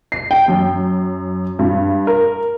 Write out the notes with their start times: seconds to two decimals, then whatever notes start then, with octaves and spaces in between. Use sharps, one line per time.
0.12 C7
0.31 G5
0.48 F#2
1.59 G2
2.07 A#4